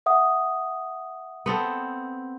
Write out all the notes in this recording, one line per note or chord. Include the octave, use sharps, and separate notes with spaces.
E5 F#5 D#6
B3 C4 A4